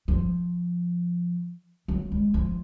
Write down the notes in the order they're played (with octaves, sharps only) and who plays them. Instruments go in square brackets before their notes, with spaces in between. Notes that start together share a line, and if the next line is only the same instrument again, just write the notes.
[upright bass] F3
F#3
G#3
F3